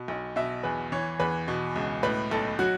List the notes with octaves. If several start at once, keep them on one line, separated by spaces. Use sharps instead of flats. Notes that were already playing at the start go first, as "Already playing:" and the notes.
Already playing: B2
B1
B2 E5
E2 B4
E3 C#5
E2 B4
B2
C#2
A2 B4
B1 A4
F#3 F#4